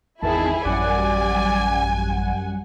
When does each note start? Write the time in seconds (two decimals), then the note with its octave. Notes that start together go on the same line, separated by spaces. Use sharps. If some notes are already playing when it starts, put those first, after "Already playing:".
0.22 G#1 E2 D#3 E4 G#4 A5
0.65 A1 F#2 G3 D5 F#5 G#5